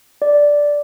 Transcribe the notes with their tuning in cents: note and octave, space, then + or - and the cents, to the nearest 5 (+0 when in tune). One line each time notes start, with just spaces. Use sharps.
D5 -5